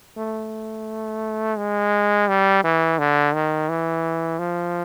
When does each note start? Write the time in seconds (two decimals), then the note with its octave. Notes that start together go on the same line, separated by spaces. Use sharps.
0.17 A3
1.58 G#3
2.28 G3
2.64 E3
2.99 D3
3.34 D#3
3.69 E3
4.39 F3